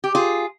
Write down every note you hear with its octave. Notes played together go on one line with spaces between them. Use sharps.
G4
F4 G#4